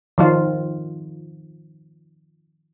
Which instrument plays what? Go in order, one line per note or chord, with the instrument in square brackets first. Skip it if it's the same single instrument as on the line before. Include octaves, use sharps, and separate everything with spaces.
[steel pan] D#3 F3 F4